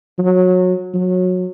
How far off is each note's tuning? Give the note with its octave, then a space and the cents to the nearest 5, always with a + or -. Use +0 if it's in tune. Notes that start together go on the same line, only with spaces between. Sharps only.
F#3 -20
F#3 -20